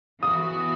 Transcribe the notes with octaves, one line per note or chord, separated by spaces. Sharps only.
E3 B3 F#4 D#6